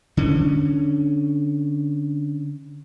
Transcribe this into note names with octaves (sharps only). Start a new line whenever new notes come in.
D3 C#4